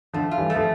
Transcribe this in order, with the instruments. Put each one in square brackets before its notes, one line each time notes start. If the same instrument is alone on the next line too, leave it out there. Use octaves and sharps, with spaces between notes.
[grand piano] D3 F3 [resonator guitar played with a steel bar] A3
[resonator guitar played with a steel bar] F4
[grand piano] E3 G3
[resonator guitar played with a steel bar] A3
[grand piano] F3